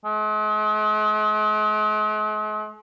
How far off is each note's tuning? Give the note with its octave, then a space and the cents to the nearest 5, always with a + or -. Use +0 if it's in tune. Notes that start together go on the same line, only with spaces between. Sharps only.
G#3 +45